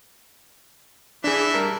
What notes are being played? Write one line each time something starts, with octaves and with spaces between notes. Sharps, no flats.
E3 D4 G#4 E5
G3 A#4 A5